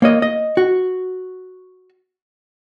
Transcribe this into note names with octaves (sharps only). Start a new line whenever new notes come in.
A#3 C#5 D#5
D#5
F#4